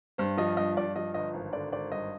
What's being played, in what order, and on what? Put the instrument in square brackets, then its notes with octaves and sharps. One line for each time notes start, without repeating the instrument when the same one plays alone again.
[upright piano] G2 C5
F3 D#5
G2 D#5
G2 D5
F3 D#5
G1 D#5
G#1
D3 D5
G#1 D5
G2 D#5